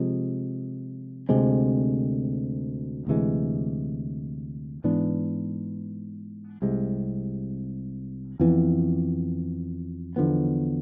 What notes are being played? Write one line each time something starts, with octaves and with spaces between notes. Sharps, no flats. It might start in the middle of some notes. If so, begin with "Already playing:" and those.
Already playing: C3 F3 G#3
D2 C3 G#3 C4
D2 C3 E3 G#3
G#2 E3 B3 D4
C2 C3 G#3
F2 E3 B3
E2 D3 F3 B3